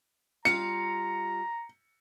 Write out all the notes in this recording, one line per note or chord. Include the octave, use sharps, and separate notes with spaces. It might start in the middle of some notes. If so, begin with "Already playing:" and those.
G3 F4 F5 A#5 C#7